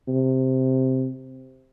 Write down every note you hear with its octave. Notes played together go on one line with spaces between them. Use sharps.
C3